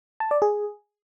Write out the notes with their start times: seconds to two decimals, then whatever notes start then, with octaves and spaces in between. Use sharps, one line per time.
0.20 A5
0.31 D5
0.42 G#4